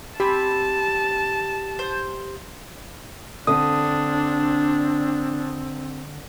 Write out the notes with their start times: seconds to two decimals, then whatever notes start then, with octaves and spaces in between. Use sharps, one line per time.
0.20 C4 G4 G#5 A5 B5
1.79 C5
3.47 D3 C4 D4 D#6